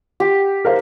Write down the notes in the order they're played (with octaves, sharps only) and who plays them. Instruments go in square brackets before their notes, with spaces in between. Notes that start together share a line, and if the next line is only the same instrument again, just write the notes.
[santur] G4
[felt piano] A#4 C5 F5